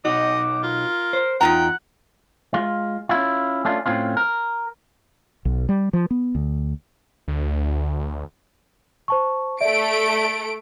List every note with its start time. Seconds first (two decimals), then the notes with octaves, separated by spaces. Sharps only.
0.05 B1 D#4 F#4 D#5 D6
0.63 F4 A#4
1.13 C5
1.41 E2 D#4 F4 F#5 G5 A#5
2.54 G#3 F4
3.09 C#4 E4 F4
3.65 A3 C#4 D4 F4
3.86 A2 C4 C#4 F4
4.17 A#4
5.45 B1
5.69 G3
5.93 F3
6.11 B3
6.35 D2
7.28 D2
9.08 C5 A5 C#6
9.61 A3 D5 E5 D7